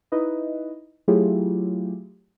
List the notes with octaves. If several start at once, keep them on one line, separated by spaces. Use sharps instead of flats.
D#4 E4 B4 D#5
F#3 A3 E4 F4 G4 G#4